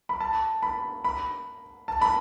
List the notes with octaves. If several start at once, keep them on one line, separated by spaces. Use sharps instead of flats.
B5
A5
B5
B5
A5
B5